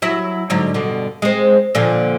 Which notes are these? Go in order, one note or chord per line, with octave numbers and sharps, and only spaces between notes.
F#3 E4 E5
G#2 D3 F#3
G2 B2 D3
G#3 C4
A#2 D3 F3